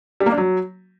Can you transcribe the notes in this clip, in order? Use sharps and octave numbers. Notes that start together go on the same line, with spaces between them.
G3
A#3
D4
F#3